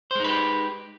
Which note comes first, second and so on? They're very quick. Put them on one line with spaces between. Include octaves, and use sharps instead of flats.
C5 G#3 D#4 B4 G4